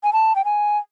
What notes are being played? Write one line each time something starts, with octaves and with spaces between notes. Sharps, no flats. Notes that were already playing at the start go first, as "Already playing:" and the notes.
G#5
A5
G5
G#5